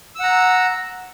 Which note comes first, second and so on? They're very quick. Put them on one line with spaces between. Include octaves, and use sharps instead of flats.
E6 F#5 A#5